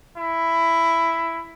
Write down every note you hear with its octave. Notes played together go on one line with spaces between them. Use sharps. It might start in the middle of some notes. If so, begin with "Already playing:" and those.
E4